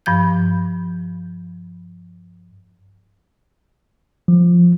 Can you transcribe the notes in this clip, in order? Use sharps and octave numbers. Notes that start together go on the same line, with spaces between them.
G2 F3 G6
F3